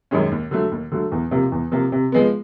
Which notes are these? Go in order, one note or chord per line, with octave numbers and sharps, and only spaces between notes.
F#2 D#3 G#3 C#4
D#2
D3 F#3 A3
D#2
D3 F#3 A3
E2
C3 F3 A#3
E2
C3 F3 A#3
C3
F3 G#3 B3